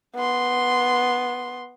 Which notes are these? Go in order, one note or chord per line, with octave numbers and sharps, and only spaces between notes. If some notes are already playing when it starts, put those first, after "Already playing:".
B3 C6